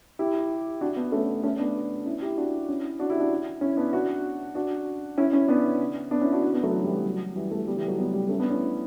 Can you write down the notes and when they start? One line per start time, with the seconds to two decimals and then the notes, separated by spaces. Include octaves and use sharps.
0.19 E4 G4
0.81 D4 F#4
0.96 B3 D4
1.12 A3 C#4
1.43 A3 C#4
1.59 B3 D4
2.06 C#4 E4
2.22 E4 G4
2.37 D4 F#4
2.68 C#4 E4
2.99 D4 F#4
3.10 E4 G4
3.20 D4 F#4
3.61 C#4 E4
3.77 B3 D4
3.93 D4 F#4
4.55 D4 F#4
5.18 C#4 E4
5.33 C#4 E4
5.48 B3 D4
6.11 B3 D4
6.21 C#4 E4
6.32 D4 F#4
6.42 D4 F#4
6.54 B3
6.63 F#3 A3
6.73 E3
6.84 E3 G3
6.95 F#3
7.05 F#3
7.36 E3 G3
7.51 F#3 A3
7.67 G3 B3
7.77 E3 G3
7.88 F#3 A3
7.98 G3 B3
8.13 G3 B3
8.29 A3 C#4
8.39 B3 D4
8.50 C#4 E4